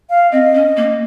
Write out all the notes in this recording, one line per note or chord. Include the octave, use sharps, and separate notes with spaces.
F5
C4 D#5
C#4
A#3